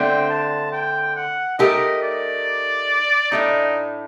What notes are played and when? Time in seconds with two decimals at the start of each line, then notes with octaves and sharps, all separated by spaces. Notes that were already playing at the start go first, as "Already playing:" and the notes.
Already playing: D3 A3 C4 G5
0.30 A5
0.72 G5
1.16 F#5
1.59 A3 D#4 G4 A#4 D#5
2.03 D5
3.32 A2 A3 D4 D#4